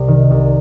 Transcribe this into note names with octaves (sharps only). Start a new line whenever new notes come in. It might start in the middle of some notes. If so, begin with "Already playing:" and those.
Already playing: C2 C3
D#3
C2